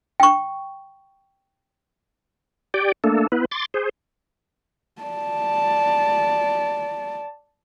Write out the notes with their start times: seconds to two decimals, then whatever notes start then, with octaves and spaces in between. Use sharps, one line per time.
0.20 G5 C#6
2.74 G4 D5 G5
3.04 A3 A#3 D4 A4
3.32 B3 E4 B4
3.51 C6 D6 A6
3.74 G#4 C5
5.02 D5 A5